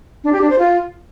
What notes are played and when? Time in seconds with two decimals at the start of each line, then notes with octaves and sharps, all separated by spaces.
0.24 D4
0.33 G4
0.41 D4
0.50 C5
0.59 F4